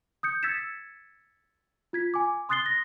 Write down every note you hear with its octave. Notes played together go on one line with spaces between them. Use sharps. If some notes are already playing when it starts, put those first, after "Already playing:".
D#6 G6 C#7
E6 G#6 A6 B6 C#7 E7
F4 G#6 B6
G#5 D6
C6 D#6 F#6 A6 C7 G7
A#6